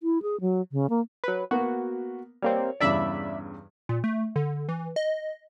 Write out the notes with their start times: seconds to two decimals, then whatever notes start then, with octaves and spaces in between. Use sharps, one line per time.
0.03 E4
0.22 G#4
0.41 F#3
0.72 C#3
0.90 A#3
1.24 F#3 B4
1.51 A#3 B3 F#4
2.42 G3 A#3 C4 C#5
2.81 E2 G2 C#3 D5 E5 B5
3.89 A#2
4.04 A3
4.36 D3
4.69 E3
4.96 D#5